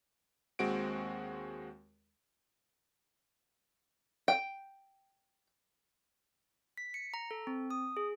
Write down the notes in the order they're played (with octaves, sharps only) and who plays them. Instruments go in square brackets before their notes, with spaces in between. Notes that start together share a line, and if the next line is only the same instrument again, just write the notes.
[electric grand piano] D#2 G#3 C4 F#4 D7
[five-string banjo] G5
[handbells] B6
C#7
A#5
A4
C4
D#6
G#4